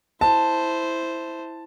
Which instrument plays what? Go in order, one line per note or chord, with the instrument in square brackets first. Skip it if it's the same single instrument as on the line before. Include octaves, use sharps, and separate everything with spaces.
[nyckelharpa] E4 C5 [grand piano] A5